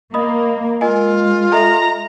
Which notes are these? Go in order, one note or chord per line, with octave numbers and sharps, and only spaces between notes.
A#3 D#5 B5 D#6
G#3 F4 A#4 D#5 G#5
A4 D#5 E5 A#5